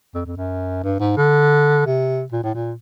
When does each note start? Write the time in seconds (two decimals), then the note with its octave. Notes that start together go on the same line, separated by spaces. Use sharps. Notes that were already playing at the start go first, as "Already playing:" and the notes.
0.15 F2
0.26 F2
0.37 F#2
0.84 G2
1.00 G#2
1.17 D3
1.86 C3
2.32 A#2
2.44 A2
2.55 A#2